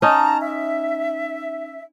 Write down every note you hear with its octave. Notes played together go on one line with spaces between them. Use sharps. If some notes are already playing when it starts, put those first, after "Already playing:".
C#4 D#4 A5 A#5
E5